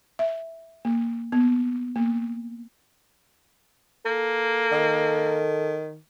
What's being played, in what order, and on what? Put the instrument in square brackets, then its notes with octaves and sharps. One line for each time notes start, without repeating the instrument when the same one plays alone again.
[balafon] E5
A#3
B3
A#3
[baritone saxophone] A#3 [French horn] A4
[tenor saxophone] D#3